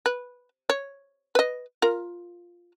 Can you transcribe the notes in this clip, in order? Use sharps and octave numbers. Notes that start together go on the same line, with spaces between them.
B4
C#5
B4 D#5
F4 A#4